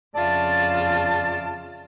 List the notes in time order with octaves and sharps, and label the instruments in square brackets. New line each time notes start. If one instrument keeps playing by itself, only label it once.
[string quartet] F2 C#3 F4 [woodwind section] D5 E5 A5